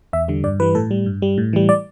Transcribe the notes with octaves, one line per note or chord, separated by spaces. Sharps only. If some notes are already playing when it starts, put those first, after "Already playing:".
E2 E5
D3 G3
G2 D5
E3 G3 B4
A2 A4
G3
G2
G3
A2
E3 G3
D5